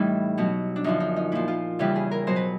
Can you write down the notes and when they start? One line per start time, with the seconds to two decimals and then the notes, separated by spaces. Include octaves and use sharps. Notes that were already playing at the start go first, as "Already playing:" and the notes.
Already playing: A2 E3 G3 D#4
0.38 B2 F#3
0.76 D4
0.84 F#2 D3 F3 D#4
1.00 D#4
1.16 D#4
1.32 A#2 F3 E4
1.48 F4
1.79 E2 C#3 E3 G3 G4
1.95 G#4
2.11 A#4
2.27 B2 F#3 C5
2.36 B4